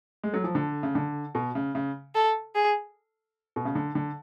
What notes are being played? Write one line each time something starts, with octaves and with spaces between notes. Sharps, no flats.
G#3
F#3
F3
D3
C#3
D3
B2
C#3
C#3
A4
G#4
B2
C#3
D3
D3